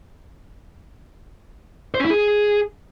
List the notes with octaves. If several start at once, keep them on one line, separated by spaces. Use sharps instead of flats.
C5
C#4
E4
G#4